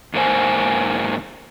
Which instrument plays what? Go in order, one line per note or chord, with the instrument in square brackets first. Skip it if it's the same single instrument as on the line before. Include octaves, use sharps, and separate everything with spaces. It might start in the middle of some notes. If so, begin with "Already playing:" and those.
[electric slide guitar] E2 G#2 A#3 C5 G#5